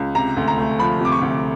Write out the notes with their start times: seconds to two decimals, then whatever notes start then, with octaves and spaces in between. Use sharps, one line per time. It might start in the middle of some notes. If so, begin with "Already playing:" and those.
Already playing: C#2
0.15 C3 A#5
0.37 D2
0.48 A#5
0.58 A3
0.79 F3 B5
1.01 C3 D6
1.12 C#6
1.22 D2